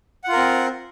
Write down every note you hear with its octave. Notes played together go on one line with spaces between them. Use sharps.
C4 F4 A#4 F#5